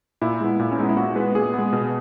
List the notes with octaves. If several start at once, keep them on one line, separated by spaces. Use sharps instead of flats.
A#2 E4
G#3 B3
A#2
C#4
G#3 B3 D#4
E4
A#2 F#4
G#3 B3 B4
A#2 G#4
G#3 B3
B2